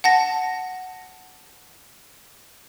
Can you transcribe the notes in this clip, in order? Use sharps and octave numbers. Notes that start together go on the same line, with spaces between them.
F#5 A5 A#6